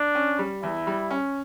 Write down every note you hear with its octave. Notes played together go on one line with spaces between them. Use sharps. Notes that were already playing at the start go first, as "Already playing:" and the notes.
Already playing: D4
C#4
G3
E2 E4
G3
C#4